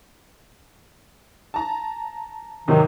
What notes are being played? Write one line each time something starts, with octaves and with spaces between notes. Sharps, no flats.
A5 A#5
G#2 C3 D#3 F#3